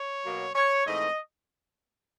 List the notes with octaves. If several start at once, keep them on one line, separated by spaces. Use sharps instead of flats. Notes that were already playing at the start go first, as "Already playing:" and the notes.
Already playing: C#5
B2 F#3 A#3
C#5
G#2 E3 A3 C4 D#5